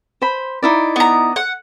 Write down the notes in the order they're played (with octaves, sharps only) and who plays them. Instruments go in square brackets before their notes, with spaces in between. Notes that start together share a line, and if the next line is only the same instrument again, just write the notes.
[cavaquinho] C5 B5
D#4 E4 D5
[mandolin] B3 A#5
F#5